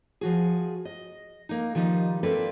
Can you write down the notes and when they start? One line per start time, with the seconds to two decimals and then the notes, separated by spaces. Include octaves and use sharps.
0.21 F3 F#4 G#4
0.85 D#5
1.49 A#3 D#4
1.75 D#3 F3 G3 D#4
2.23 A#3 C4 A4 B4 D5 E5